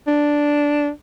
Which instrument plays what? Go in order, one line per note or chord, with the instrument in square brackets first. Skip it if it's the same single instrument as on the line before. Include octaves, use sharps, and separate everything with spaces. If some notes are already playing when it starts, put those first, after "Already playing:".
[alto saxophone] D4